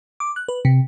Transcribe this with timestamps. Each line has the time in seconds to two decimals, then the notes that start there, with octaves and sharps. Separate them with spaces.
0.20 D6
0.36 F#6
0.48 B4
0.65 C3